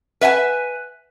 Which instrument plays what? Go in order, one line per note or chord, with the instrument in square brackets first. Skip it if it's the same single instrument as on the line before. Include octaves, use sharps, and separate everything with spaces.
[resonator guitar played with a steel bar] B4 E5 F#5 G#5